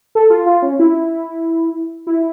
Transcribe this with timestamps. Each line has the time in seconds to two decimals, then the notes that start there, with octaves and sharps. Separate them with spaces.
0.15 A4
0.30 F4
0.46 F4
0.62 C#4
0.79 E4
2.07 E4